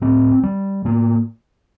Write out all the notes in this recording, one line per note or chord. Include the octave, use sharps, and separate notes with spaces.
A2 C4
G3
A2 A#3